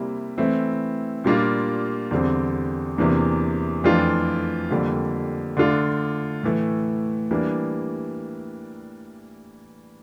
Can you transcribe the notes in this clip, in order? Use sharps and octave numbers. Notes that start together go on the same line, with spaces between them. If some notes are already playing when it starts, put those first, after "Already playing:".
Already playing: C3 G3 A#3 E4
E3 A3 C4 E4
A#2 G3 A#3 D4 F4
E2 D3 G3 C4
E2 C3 E3 A#3 D4
F2 E3 A3 D4 F4
F2 D3 G3 A#3
D3 A3 D4 F4
A2 E3 A3
E3 G3 A#3 D4